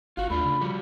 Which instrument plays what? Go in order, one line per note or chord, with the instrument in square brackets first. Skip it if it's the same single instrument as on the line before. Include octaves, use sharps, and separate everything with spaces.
[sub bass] G1 [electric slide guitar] F4 F#4 [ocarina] F5
[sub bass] D#2 [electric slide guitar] A3 D4 F4 [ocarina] B5
[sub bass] C#3
[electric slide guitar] F3 G3 F#4